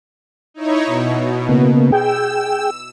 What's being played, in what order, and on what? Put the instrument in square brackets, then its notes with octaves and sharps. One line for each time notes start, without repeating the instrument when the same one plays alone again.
[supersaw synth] D#4 E4 C#5
B2
[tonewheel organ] C#3 A#3 B3
[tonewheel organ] G#4 G5 [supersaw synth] E6